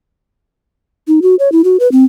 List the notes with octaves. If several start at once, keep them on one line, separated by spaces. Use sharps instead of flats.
D#4
F#4
C#5
E4
F#4
B4
C4